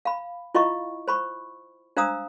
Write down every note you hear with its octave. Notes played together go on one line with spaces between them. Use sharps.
F5 B5
E4 F4 D#5 F5 B5 C#6
C5 B5 C#6
D4 C5 F5 A#5 D#6 E6